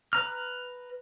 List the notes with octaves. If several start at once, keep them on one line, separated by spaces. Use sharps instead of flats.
B4 A#5 F6